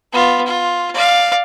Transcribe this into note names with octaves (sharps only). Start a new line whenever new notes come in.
B3 F4
F4
D5 F5